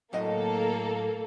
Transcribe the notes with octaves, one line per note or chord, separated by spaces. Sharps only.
A2 F#3 A#3 A4 D#5